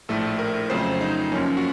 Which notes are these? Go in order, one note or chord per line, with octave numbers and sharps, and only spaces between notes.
A#1 A2 A3 A4
A#4
F2 C#3 F#3 A3 C5
D#4
F#2 F3 A#3 C#4
F#4